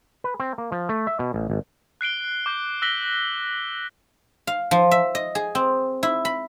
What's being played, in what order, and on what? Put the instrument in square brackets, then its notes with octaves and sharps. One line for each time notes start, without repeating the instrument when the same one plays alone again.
[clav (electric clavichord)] B4
C4
A#3
F3
A3
E5
B2
A1
G#1
[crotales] F#6 C7 D7 G7
D6 G6
E6 F#6 A#6 B6 G7
[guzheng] F5
F3
E5
D#5
G#4
C4
E4
B5